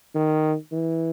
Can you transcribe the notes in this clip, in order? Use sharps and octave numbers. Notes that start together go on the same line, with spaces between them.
D#3
E3